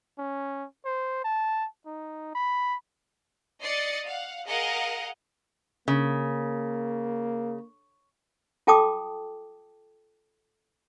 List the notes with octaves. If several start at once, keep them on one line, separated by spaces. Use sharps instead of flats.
C#4
C5
A5
D#4
B5
D5 D#5 D#6 A6 C7 C#7
F5 F#5
G#4 A#4 D#5 F5 F#5
C#3 A#3
F4 A4 G5 A5 D6 D#6